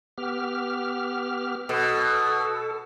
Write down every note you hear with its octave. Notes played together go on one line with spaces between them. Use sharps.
B3 G4 F6
B2 A4